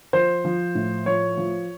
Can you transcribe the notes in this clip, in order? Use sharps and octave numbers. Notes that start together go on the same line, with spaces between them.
F3 C5
F3
A2
F3 C#5
F3